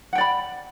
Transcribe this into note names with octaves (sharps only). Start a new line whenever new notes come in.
D5 F#5 G5 B5